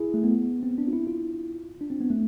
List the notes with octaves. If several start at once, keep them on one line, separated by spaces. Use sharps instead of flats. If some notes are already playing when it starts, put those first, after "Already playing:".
Already playing: E4 G#4
A3
B3
C4
D4
F4
E4
F4
D4
C4
B3
A3